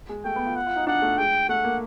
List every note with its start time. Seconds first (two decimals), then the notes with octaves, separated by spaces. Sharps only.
0.09 G#3
0.25 A3 G5
0.36 B3
0.46 F4
0.56 F#5
0.66 F4
0.76 D#4
0.87 D4 F#5
1.02 A3
1.18 G#3 G5
1.49 A3 F#5
1.64 A#3